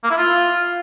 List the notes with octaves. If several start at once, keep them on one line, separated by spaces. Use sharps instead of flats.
A#3
E4
F4